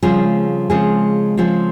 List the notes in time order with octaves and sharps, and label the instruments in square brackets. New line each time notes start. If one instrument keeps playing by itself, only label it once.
[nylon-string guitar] C#3 F3 C4 F4 G#4 [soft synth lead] G3
[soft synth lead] G#3
G3
[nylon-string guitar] C#3 F3 C4 F4 G#4 [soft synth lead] G#3
[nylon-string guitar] C#3 F3 C4 F4 G#4